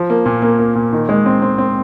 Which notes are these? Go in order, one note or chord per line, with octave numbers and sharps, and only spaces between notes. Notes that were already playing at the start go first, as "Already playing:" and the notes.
Already playing: F3
A#3
A#2
A#3
A#3
A#2
D#3
G#3
C4
C4
C4